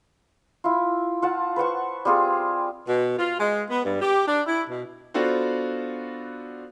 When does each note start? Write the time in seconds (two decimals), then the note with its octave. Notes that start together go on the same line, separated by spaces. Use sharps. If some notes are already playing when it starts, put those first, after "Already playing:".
0.64 E4 F4
1.22 F4 F#5 A5
1.56 B4 C5 F#5 C#6
2.05 G3 C4 F4 G#4
2.88 B2
3.19 F4
3.40 G#3
3.70 B3
3.85 G2
4.02 G4
4.28 D4
4.46 E4
4.69 B2
5.14 B3 D4 F4 F#4 A4 C5